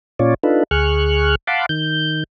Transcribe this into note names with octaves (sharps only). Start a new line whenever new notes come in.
A#2 C#4 F4 C#5 D5
D4 D#4 F4 A4 B4
D2 G#4 C#6 F6 F#6
F5 F#5 A5 B5 C6 D6
D#3 G6